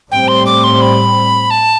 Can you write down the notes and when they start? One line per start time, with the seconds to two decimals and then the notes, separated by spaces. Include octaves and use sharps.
0.11 A2 G3 C4 G5
0.28 C6
0.46 D6
0.64 C6
0.82 B5
1.51 A5